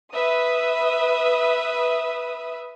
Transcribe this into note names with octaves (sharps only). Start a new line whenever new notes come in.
B4 E5 D#6